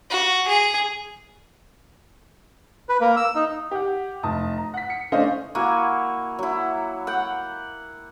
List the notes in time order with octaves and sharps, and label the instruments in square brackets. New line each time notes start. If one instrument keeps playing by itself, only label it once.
[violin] F#4
G#4
[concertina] B4
A#3
E6
D#4
[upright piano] G4 F#5
F1 A5 D#6
A#5
F#5 B6
C#7
A3 C#4 D4 C5 D#5 F5
[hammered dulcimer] A#3 E4 F#4 G#5
F#3 E4
F#5 G5